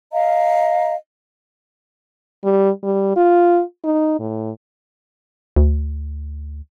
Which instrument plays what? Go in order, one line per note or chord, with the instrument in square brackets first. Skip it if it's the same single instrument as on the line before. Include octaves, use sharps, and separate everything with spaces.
[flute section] D#5 F5 A#5
[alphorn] G3
G3
F4
D#4
A2
[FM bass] D2